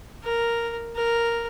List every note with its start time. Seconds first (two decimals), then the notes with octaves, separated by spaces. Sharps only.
0.24 A#4
0.96 A#4